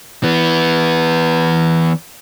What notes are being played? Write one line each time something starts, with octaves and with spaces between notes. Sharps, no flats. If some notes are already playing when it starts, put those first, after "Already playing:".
E3 B3